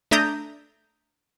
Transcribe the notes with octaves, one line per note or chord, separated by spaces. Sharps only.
A3 D4 E5 A#5 D#6 G6